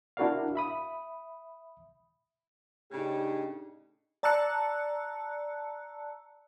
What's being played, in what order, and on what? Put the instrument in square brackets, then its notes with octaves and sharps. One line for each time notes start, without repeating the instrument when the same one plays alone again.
[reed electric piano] D4 E4 F#4 A#4 D5 F5
E5 B5 D#6
[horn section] A2 C#3 [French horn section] D4 D#4 [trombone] G4
[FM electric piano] D5 A5 A#5 E6 F#6 C#7